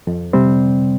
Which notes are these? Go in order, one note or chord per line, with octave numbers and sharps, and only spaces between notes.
F2
C3 G3 C4